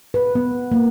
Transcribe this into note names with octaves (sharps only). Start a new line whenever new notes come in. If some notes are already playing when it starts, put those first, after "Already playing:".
B4
B3
A#3